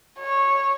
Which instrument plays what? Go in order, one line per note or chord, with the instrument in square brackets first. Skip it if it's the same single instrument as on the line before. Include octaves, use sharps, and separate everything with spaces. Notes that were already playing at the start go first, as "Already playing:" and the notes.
[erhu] C#5